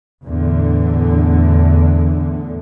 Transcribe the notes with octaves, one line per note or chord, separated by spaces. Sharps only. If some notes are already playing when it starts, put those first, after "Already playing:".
E2 A2 D3